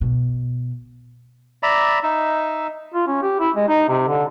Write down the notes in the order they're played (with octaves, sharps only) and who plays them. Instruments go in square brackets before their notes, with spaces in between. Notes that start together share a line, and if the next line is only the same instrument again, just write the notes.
[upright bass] B2
[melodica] D5 E5 A#5 B5
D#4 E5
[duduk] F4
C#4
G4
E4
G#3
D#4
C3
D3